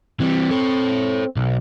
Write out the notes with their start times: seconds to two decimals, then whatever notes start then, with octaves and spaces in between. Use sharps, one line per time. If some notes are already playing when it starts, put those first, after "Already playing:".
0.20 E3 G3 C4
0.51 A4 C#5
1.36 B1